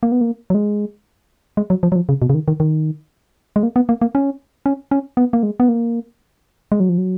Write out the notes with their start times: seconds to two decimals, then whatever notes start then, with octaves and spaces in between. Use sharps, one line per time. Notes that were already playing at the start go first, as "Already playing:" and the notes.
0.03 A#3
0.12 B3
0.21 A#3
0.50 F#3
0.54 G#3
1.57 G#3
1.70 F#3
1.83 F3
1.92 F#3
1.96 F3
2.09 C#3
2.22 B2
2.30 C#3
2.34 D#3
2.48 D#3
2.60 D#3
3.56 G#3
3.63 A#3
3.76 B3
3.89 A#3
4.01 A#3
4.15 C#4
4.66 C#4
4.91 C#4
5.17 B3
5.33 A#3
5.43 G#3
5.60 B3
5.69 A#3
6.72 G#3
6.80 F#3
6.89 F3
6.98 F#3